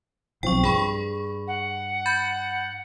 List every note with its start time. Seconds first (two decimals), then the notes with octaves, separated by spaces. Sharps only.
0.43 B1 F3 C4 G5 C#6
0.64 G2 G#4 B5 C#6
1.47 F#5
2.06 B5 G6 A6